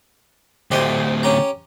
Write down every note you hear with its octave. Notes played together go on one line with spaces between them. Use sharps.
D2 A2 G4 C5 D#5
C#4 G4 A#5